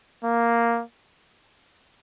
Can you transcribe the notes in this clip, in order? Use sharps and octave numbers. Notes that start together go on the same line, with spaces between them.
A#3